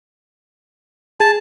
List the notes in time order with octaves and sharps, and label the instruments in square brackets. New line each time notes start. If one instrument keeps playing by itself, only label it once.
[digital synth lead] G#4 [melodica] A5